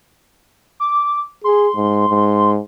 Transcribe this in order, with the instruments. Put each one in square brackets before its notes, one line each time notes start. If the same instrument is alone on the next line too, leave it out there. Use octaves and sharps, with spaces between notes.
[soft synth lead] D6
[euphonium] G#4 [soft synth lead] C6
[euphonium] G#2
G#2